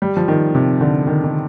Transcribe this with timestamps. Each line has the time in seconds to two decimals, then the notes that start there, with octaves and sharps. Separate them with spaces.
0.02 G3
0.17 F3
0.28 D#3
0.55 C3
0.81 D3
1.07 D#3
1.24 D#3